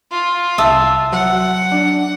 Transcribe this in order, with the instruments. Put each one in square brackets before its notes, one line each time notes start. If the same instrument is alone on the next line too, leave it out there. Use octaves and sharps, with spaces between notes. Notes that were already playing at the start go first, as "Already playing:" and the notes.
[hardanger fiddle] F4
[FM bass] C2 [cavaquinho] E5 A5 D#6
[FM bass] F#3 [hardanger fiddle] F#5
[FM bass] D4